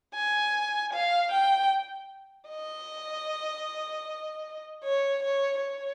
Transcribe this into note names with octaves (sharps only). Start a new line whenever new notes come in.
G#5
F5
G5
D#5
C#5
C#5
C#5